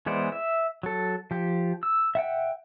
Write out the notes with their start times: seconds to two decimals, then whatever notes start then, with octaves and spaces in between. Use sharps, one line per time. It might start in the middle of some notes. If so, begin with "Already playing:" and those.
0.06 E3 G#3 B3 C5 D5
0.32 E5
0.83 F#3 A4
1.31 F3 G4
1.83 E6
2.15 E5 F#5 G5